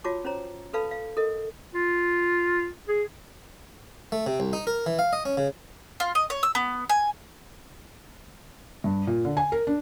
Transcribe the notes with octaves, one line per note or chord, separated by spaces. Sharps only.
F4 F#4 C#5 A5 D6
C#4 C5 C#5 A#5
A4 B4 F5 A5 B5
F5
A4 A#4 D#5
F4
G#4
A3
C3
C2
D#4
A#4
E3
F5
D#5
C#4
C#3
F4
D#5
C#5
E6
B3
G#5
G2
A#2
D3
G#5
A#4
D4